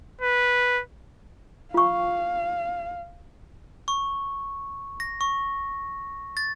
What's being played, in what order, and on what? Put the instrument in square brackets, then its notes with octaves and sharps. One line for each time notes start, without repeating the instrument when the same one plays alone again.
[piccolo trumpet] B4
[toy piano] F4 C#6 [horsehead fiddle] F5
[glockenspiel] C#6
A#6
C#6
A6